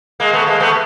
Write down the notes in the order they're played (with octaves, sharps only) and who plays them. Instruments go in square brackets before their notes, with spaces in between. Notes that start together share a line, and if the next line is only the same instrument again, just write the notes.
[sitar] G#3 A#3
A3 B3
G#3 A#3
A3 B3